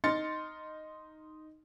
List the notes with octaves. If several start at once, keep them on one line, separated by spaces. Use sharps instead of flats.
D#4 D#5 C6 F6 A6 C#7